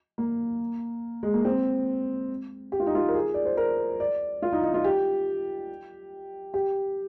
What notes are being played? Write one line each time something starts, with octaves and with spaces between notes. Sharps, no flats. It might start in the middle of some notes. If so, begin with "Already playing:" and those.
A#3
G#3
A#3
C4
G4
F4
D#4
F4
A#4
G#4
D5
C5
A#4
D5
F4
D#4
D#4
F4
G4
G4